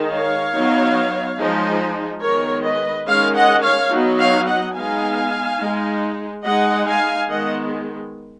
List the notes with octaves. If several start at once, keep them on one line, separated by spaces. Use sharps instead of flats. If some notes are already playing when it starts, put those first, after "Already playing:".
Already playing: D#3 G#3 D#4
C#5 F5
F#3 B3 D#4
F3 G#3 D#4
D#3 G#3 B3 A#4 C#5
B4 D#5
D#3 G#3 C#4 C#5 F5
D#5 F#5
C#5 F5
F#3 B3 D#4
C#5 F5
D#5 F#5
G#3 B3 D#4 F5 G#5
G#3 D#4
G#3 D#4 D#5 F#5
F5 G#5
D#3 G#3 B3 D#5 F#5